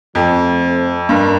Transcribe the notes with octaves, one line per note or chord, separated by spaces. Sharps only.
F2 F3 A3 C4
G2 A#4